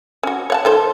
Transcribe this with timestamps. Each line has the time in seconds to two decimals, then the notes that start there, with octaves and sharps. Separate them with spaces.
0.23 C#4 F#4
0.50 C#5 F#5 A5
0.65 D#3 A4 C5